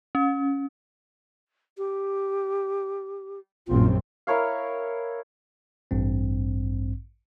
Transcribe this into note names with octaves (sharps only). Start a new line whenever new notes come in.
C#4
G4
A#1 F#2 C4 F4
E4 A#4 C#5 F5
A1 G2 C4